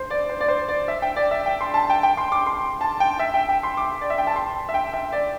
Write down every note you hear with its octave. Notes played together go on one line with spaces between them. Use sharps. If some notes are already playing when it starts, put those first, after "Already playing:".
Already playing: C5
D5
C5
D5
C5
D5
E5
G5
D5
E5
G5
C6
A5
G5
G5
C6
D6
C6
A5
G5
E5
G5
G5
C6
D6
D5
E5
G5
A5
C6
E5
G5
E5
D5